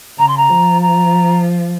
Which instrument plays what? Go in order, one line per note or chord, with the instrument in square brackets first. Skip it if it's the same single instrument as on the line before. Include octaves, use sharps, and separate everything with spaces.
[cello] C#3 [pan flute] A#5
[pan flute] C6
A#5
[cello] F3
[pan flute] A#5